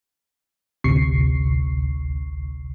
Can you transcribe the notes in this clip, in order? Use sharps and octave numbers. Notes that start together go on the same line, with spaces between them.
A1 D2 C3 C#6 C7